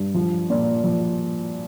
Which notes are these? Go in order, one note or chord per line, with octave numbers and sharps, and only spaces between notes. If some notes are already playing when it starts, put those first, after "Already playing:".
Already playing: G2
F3
A#2
F3